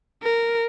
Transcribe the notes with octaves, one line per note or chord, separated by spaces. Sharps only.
A#4